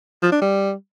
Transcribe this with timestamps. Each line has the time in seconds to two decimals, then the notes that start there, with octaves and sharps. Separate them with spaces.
0.23 F3
0.32 D4
0.42 G3